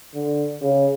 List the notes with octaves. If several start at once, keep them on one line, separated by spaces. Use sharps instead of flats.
D3
C#3